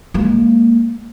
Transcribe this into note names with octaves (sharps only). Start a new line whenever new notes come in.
G#3 A#3